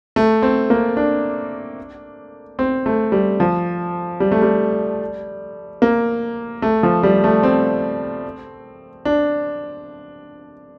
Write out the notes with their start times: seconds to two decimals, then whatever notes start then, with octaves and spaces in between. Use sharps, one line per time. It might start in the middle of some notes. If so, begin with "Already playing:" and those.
0.16 A3
0.42 C4
0.70 A#3
0.97 D4
2.59 C4
2.86 A3
3.12 G3
3.40 F3
4.20 G3
4.31 A3
4.42 G3
5.82 A#3
6.62 A3
6.83 F3
7.03 G3
7.24 A3
7.43 C4
9.05 D4